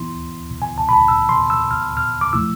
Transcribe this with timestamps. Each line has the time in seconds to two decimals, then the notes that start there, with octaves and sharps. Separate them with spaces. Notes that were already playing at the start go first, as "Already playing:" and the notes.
Already playing: E3 B3 E4 C6
0.62 G#5
0.78 A5
0.89 B5
0.93 A5
1.08 E6
1.29 C6
1.50 E6
1.71 F6
1.97 F6
2.21 D6
2.33 F3 A3 E4 E6